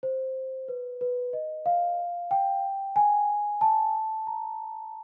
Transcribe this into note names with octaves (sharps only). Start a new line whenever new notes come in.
C5
B4
B4
D#5
F5
G5
G#5
A5
A#5